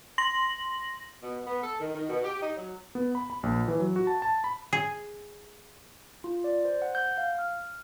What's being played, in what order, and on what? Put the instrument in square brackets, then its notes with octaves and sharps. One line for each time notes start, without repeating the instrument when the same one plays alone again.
[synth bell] C6 A#6 F#7
[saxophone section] B2
B3
A4
D#3
D#3
B2
G4
D#4
F#3
[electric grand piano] B3
B5
B5
A#1
E3
F#3
F#4
A5
A5
B5
[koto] G#4
[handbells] F4
D5
C5
F#5
G6
F5
F6